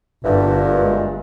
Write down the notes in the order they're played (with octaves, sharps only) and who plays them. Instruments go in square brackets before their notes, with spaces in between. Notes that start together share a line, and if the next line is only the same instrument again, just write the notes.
[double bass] G1 [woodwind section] G2 A#2 E3 [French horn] D3
[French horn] G#3